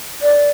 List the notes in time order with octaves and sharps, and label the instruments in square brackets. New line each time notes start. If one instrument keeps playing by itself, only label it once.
[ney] D5